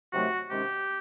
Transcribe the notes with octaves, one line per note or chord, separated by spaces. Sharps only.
C3 D#3 F#3 A3 F#4
C3 D#3 G#3 C#4 G4